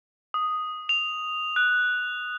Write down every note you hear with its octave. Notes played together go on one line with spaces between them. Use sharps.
D#6
F7
F#6